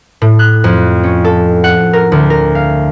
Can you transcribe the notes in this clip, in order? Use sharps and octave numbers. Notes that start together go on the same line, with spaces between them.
A2
F#6
F2
C#4
A4
F#5
A#4
D2
A#4
F5